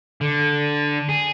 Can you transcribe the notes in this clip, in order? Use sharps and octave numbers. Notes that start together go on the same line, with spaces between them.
D3
G#4